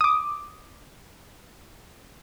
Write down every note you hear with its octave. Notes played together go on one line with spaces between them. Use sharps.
D6 D#6